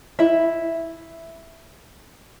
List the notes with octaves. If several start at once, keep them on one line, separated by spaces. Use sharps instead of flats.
E4 E5